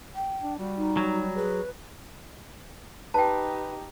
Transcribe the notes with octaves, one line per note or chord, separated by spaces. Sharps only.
G5
D4
G3 F#4
D#4
F#3
G#4 B4
D#4 G4 B4 G5 A5